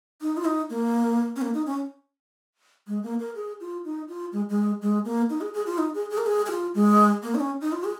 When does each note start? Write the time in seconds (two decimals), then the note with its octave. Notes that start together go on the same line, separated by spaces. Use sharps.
0.22 D#4
0.37 F4
0.45 D#4
0.70 A#3
1.36 C#4
1.42 A#3
1.54 D#4
1.66 C#4
2.88 G#3
3.03 A#3
3.20 A#4
3.36 G#4
3.60 F4
3.85 D#4
4.09 F4
4.32 G#3
4.50 G#3
4.82 G#3
5.05 A#3
5.30 D#4
5.41 G#4
5.54 G#4
5.66 F4
5.78 D#4
5.94 G#4
6.10 G#4
6.18 A#4
6.26 G#4
6.46 G#4
6.50 F4
6.75 G#3
7.23 A#3
7.35 D#4
7.40 C#4
7.61 D#4
7.72 F4
7.84 G#4